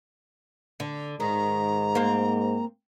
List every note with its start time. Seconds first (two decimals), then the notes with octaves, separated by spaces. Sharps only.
0.80 D3
1.20 G#2 D#3 A#5
1.95 A#3 C4